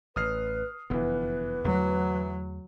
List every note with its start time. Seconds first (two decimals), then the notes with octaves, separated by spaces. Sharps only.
0.16 A1 B4 D#6 F6 C7
0.90 F1 F#2 D3 E3 B3 B4
1.64 E2 D3 F#3 A3